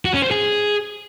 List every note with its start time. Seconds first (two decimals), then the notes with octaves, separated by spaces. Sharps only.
0.05 F#4
0.14 C#4
0.22 C5
0.31 G#4